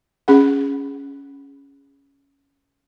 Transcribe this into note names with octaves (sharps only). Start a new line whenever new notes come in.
C#4 G#4 F#5